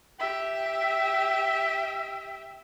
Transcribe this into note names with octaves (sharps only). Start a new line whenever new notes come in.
G4 E5